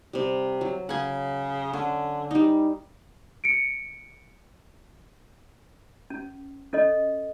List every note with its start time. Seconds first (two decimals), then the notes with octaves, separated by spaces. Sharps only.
0.13 C3 G3
0.61 F#3
0.89 C#3 F#5 G#5
1.73 D3 C#4
2.31 G3 D#4
3.44 C#7 D7
6.10 C#4
6.73 C#4 A4 D#5